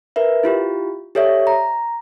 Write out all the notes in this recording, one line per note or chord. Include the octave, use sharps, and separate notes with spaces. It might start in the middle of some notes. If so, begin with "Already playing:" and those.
A#4 B4 E5
E4 F4 G4
G4 A4 C#5 D5 E5
A#5